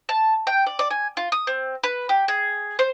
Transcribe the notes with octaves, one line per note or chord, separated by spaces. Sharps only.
A5
G5
D5
D5
G#5
F4
D#6
C4
B4
G4
G#4
C5